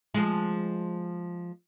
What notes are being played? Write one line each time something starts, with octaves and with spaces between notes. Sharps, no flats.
F3 G#3